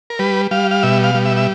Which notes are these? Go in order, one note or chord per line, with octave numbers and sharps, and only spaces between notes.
A#4
G3 B4
G3 F5
F5
B2 E5
F5
G3
E5
E5